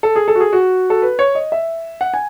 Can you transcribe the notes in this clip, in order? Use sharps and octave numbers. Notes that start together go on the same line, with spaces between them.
A4
G#4
A4
F#4
G#4
F#4
A4
B4
C#5
D#5
E5
F#5
G#5